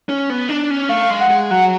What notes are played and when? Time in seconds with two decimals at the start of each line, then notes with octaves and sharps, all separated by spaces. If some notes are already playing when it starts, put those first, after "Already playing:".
0.09 C#4
0.30 B3
0.49 D4
0.70 C#4
0.89 A3 F5
1.10 G#3
1.20 F#5
1.30 G#3
1.51 F#3 F#5